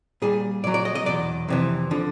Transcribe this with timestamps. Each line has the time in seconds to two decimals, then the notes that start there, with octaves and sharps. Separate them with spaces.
0.22 A#2 G3 G#4
0.64 A#2 F#3 D5
0.74 D5
0.85 D#5
0.95 D#5
1.06 E2 B2 F#3 D5
1.48 F2 C3 E3
1.91 D3 F3